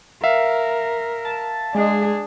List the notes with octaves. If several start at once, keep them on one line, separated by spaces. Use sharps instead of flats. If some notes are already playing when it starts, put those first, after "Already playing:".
A#4 E5 F5
A5
G#3 D4 G#4